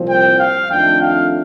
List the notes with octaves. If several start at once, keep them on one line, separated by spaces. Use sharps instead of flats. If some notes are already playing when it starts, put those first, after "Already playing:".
Already playing: C2 A#2 F3 C4
G5
F5
F2 D#3 A3 D4 G5
F5